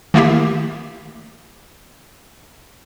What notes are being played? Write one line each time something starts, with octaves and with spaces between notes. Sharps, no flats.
D#3 A3 A#3 E4 G4